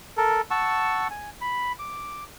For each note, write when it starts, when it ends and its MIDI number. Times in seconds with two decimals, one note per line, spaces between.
0.17 0.41 69
0.17 0.41 70
0.51 1.08 78
0.51 1.08 81
0.51 1.08 85
0.51 1.08 88
1.11 1.30 80
1.41 1.72 83
1.79 2.24 86